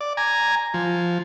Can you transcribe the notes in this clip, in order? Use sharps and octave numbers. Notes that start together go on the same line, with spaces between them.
D5
G#5 A#5
F3